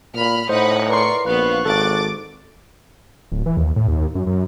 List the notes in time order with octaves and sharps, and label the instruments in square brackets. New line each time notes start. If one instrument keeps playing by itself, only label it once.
[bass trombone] A#2 [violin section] B5 F6
[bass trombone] A2 [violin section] D#4 F#5 B5 [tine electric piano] C5 [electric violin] D#5
[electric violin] A#4 D5 [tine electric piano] B4 A#5 C6 [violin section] C#6 C7
[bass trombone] A#1 [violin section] B3 F5 [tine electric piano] B4 [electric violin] C#6 F#6
[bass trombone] G#1 [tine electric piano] A4 [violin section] D6 A6
[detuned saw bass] D1
E3
D#2
A2
D#2
F#2
F#2